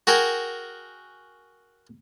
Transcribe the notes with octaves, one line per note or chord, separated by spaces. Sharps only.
F#4 G#4 A#4 G5